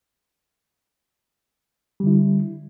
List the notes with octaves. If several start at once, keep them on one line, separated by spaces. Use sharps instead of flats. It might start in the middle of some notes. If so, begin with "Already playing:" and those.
D3 G3 E4